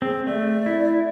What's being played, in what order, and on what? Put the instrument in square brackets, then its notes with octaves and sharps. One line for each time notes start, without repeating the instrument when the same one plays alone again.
[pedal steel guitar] C4 [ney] G#4
[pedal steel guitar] A3 [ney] D5
[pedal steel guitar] E4